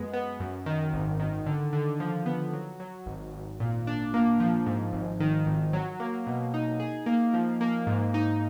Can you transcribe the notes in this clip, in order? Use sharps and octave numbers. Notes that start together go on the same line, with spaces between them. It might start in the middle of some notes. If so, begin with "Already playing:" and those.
Already playing: F#2 G#3 B3
B3
F#2
D#3
G#1
D#3
D3
D3
F3
B3
F#3
F#3
G#1
G#1
A#2
D4
A#3
F3
G#2
G#1
D#3
G#1
F#3
A#3
B2
D#4
G#4
A#3
F3
A#3
G#2
D#4